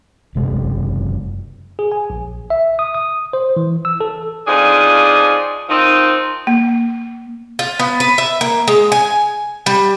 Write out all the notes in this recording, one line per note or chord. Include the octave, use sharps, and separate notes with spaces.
F#1 C3 G#3
G#4
G#5
A#1
E5
D#6
D#6
C5
E3
E6
A4
F2 F3 D4 D#4 G#4
D#3 F3 C4 D#4
A#3
F4
B3
B4
E5
A#3
G#3
G#5
G3